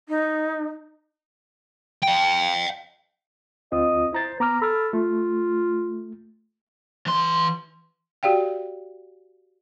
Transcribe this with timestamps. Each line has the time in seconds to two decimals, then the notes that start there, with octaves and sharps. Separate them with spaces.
0.09 D#4
2.03 F5 G5
3.72 D2 C4 F4 D#5
4.13 E4 C5 A#5 A6
4.40 B3 A#5 D6 F6
4.62 A4 B5 F6
4.93 A3 F4
7.06 E3 C6
8.23 F#4 G4 D5 F5 G5